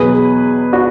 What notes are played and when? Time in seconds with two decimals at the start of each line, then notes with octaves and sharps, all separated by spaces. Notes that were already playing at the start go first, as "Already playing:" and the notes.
Already playing: E2 B2 F#3 G#4 B4
0.73 D4 F#4